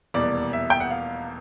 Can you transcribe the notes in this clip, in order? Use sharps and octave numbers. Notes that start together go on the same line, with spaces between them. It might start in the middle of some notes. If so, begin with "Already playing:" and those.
F1 E2 B2 G3 A#3 D5
E5
G5
F#5
F5